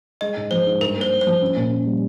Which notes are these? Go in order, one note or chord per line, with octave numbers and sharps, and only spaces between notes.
G#3 D#5
G#2
F3 C5
G#2
G2 A#4
A#3
C5
A#3
C5
F3
C#4
A#2
C#4
G3